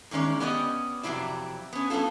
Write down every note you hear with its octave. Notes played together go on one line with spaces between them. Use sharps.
E2 D#3 G#3 C#4 D5
B3 C#4 G4 D5 D#5
F2 C3 F#3 A#3 E4 D5
B3 C#4
G3 B3 C#4 F4 A4